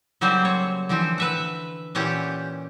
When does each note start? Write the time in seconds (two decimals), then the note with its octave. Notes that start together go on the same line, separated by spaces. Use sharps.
0.21 C#3 F#3 G3 A#3 C4 C5
0.45 C#5
0.89 D3 E3 F3 C4
1.18 B4 E5 F#5
1.95 A#2 E3 C#4 G4 F#5